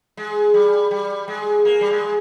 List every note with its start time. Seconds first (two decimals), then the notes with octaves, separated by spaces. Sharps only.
0.17 G#3
0.54 G3
0.91 G3
1.28 G#3
1.65 A#3
1.81 G3
1.91 G#3